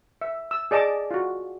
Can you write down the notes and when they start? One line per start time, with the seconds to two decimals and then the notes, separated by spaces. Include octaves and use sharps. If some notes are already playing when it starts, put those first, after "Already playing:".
0.21 E5
0.51 E6
0.71 G#4 D5 D#5 A5 D6
1.11 F4 F#4